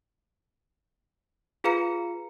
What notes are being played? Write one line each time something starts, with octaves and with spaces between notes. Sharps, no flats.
F4 G#4 B4 F5 A#5 C#7